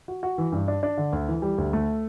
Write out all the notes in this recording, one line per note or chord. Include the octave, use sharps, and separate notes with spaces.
F#4
F#4
E3
G2
D4
D4
D3
D2
E3
G3
D2
A3